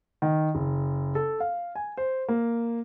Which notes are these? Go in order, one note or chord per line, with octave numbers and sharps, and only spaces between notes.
D#3
F#1
A4
F5
G#5
C5
A#3